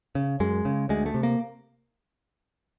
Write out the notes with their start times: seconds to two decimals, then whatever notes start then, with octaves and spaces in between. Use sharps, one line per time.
0.15 C#3
0.40 F#2 G#3
0.65 C#3
0.89 D2 G#3
1.06 A3
1.14 C3
1.23 A#3